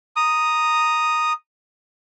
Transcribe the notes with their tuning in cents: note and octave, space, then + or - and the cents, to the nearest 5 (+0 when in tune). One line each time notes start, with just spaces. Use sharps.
A#5 +0 D#6 +0